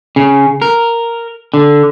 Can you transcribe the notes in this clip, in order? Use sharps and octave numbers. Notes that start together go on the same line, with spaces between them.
C#3
A#4
D3